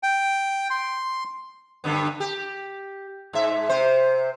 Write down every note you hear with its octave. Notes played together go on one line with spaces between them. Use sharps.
G5
C6
G2 D3 B3
G4
G#2 E5
C3 C5